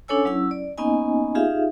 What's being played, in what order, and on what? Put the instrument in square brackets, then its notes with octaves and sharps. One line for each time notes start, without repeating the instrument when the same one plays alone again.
[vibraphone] C#4 D4 A4 C#5 G#5 E6
F#3 C#4 E4 E6
D5
A#3 B3 C#4 D#4 D#5 G#5
D#4 F4 G4 G#4 E5 F5